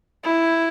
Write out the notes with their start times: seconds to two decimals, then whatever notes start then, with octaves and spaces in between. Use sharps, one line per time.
0.24 E4